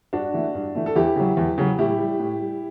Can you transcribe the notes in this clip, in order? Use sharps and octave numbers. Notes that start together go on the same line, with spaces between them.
G2 D4 F#4
E3 A3
G2
E3 A3
A4
E2 E4 G4
C#3 F#3
E2
C#3 F#3
A2 E4 G4
G3
A2
G3